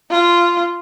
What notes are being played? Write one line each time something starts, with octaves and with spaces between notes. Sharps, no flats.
F4